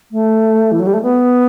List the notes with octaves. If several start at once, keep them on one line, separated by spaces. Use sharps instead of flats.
A3
E3
F#3
G3
A3
B3